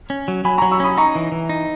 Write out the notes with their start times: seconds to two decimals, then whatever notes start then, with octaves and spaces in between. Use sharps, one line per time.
0.10 C#4
0.28 F#3
0.45 F#3 G#5 B5
0.58 F#3 A#5 C#6
0.71 C#6 E6
0.80 C#4 B5 D#6
0.97 D#4 A#5 C#6
1.15 E3
1.32 E3
1.49 D#4